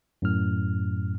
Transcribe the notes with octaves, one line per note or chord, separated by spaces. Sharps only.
F#2 A2 F6